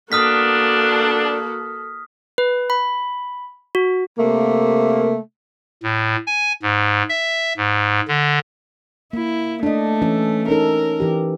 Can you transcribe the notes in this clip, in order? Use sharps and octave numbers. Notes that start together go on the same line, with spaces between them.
A#3 B3 D4 F#4 A4 D#6 F6 B6
B4
B5
F#4
C3 A3 A#3
A2
G#5
G#2
E5
G#2
D3
A#3 E4
A3 D4 D#5
E3 C#4 A4
C#4 D#4 A4 A#4
E3 G4